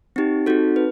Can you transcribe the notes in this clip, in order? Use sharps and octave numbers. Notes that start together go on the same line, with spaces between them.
C4 D#4 G4
C4 D#4 F#4 A4
B4